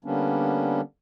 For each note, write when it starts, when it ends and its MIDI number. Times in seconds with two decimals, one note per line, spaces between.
0.05 0.81 50
0.05 0.81 55
0.05 0.81 58
0.05 0.81 59
0.05 0.81 61
0.05 0.81 62